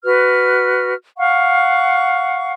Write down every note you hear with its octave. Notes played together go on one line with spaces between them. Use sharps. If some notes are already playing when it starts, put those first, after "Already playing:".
F#4 B4 F6
F5 F#5 C#6